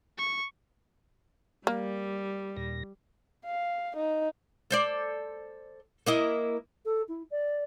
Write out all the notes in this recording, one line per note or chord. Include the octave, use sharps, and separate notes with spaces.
C#6
G3 A#3
D#2 A#2 A#6
F5
D#4
A4 C5 D5
A#3 E4 D#5
A4
E4
D5